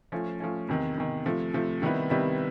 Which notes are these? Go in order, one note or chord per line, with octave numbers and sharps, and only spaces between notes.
F3 A3 C#4
F3 A3 C#4
E2 C3 D#3
E2 C3 D#3
C3 F3 A3
C3 F3 A3
C3 D#3 G3 B3 E4
C3 D#3 G3 B3 E4